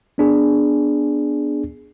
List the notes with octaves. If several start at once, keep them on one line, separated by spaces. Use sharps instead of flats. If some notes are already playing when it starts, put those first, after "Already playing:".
B3 D4 G#4